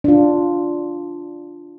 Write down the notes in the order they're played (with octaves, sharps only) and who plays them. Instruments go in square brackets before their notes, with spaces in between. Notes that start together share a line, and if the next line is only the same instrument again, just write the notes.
[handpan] D4 F4